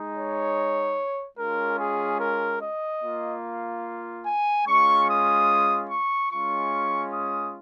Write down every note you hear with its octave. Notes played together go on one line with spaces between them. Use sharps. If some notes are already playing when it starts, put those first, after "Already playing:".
Already playing: G#3 D#4
C#5
G#3 C#4 F4 A#4
G#4
A#4
D#5
A#3 F4
G#5
G#3 C#4 F4 C#6
D#6
C#6
G#3 C#4 F4 C#6
D#6